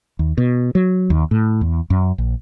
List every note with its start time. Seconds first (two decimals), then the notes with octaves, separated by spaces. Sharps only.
0.19 D#2
0.38 B2
0.75 F#3
1.10 D#2
1.31 A2
1.61 E2
1.90 F#2
2.18 A#1